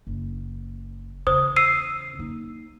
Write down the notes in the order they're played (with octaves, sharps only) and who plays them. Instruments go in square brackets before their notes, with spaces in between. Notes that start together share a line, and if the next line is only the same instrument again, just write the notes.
[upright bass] F#1
[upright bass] E2 C#3 [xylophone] C5 D#6
[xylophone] E6 C7 D#7
[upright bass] A#3 D#4